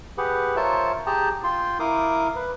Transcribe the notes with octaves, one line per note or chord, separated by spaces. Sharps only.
G4 G#4 B4 F#5
F4 A#4 C5 C#5 E5 A5
G4 G#4 G5 A5 A#5
F4 G5 C6
E4 A#4 F5 D6 D#6
B4